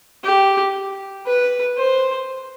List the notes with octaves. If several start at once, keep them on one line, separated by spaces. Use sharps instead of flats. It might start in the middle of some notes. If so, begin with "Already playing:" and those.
G4
B4
C5